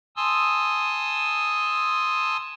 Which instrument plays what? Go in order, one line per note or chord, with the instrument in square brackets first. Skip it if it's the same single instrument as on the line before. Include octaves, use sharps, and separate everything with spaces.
[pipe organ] G#5 A5 C6 D#6 E6